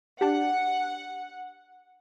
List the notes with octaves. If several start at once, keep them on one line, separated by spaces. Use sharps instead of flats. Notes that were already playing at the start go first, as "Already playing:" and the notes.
D4 G4 F#5